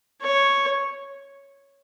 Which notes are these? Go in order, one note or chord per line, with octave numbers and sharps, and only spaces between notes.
C#5